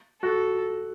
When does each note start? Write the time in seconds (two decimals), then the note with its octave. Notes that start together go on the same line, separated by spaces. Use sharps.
0.22 F#4 A4